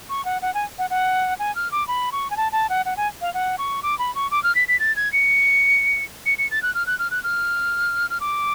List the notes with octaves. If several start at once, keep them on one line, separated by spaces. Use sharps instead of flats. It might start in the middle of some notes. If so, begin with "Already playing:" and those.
C#6
F#5
F#5
G#5
F#5
F#5
G#5
F6
D6
B5
C#6
G#5
A5
A5
F#5
F#5
G#5
F5
F#5
C#6
D6
B5
C#6
D6
F6
B6
B6
A6
G#6
C#7
C#7
C#7
A6
F#6
F6
F#6
F6
F#6
F6
F6
D6